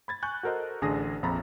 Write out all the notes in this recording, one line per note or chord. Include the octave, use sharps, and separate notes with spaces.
B5 G#6 A6
G#5 C#6 F#6 G6
F#4 A4 A#4 C5 D#5
A1 D3 D4 G#4 D#6 A#6
A#1 F2 F3 A#5 B5 A6